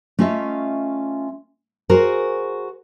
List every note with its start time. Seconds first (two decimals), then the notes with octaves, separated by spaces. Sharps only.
0.19 A3 C#4 F4 D#5 E5
1.89 F#4 G#4 A#4 C5